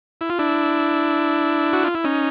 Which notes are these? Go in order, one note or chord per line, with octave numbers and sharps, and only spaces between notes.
E4
F4
D4 E4
F#4
F4
E4
C#4 D#4